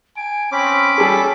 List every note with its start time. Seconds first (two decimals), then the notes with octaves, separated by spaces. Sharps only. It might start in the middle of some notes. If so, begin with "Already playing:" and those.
0.17 G#5 D7
0.52 C4 C#4 B5 D6
0.98 G3 G#4 A4